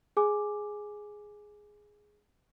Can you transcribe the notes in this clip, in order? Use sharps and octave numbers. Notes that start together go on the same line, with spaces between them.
G#4 G#5 D6